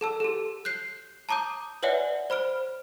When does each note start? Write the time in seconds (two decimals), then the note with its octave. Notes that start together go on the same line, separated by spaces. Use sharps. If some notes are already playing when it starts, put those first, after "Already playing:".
0.01 A4 A5 E6
0.20 G4 A4
0.65 F#6 G6 C7
1.29 A5 A#5 D6 D#6 G6
1.83 B4 C#5 D5 E5 F#5 G#5
2.30 C5 B5 F6 D7